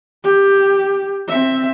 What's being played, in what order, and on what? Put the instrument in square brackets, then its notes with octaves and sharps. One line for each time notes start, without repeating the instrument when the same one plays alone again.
[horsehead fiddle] G4
C4 E5